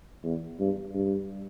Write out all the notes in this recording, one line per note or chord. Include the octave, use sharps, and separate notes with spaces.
E2
G2
G2